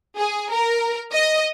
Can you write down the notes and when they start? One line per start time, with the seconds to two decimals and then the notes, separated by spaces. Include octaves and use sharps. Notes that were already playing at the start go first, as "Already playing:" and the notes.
0.17 G#4
0.52 A#4
1.13 D#5